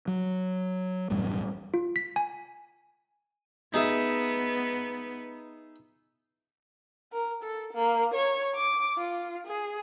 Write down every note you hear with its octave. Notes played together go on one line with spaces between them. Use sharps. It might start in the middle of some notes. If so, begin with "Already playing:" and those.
F#3
E1 A1 F#2 G3
F4
B6
G#5
B3 D#4 G#4 E5
A#4
A4
A#3
C#5
D6
F4
G#4